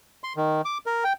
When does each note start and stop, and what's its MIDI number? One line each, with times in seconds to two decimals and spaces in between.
0.24 0.33 84
0.36 0.62 51
0.65 0.78 86
0.86 1.04 70
1.04 1.13 79